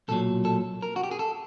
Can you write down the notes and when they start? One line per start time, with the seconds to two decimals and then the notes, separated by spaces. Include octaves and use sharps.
0.08 B1 A#2 F#3 A4
0.45 A4
0.82 A#4
0.96 F#4
1.04 G4
1.11 G#4
1.19 A4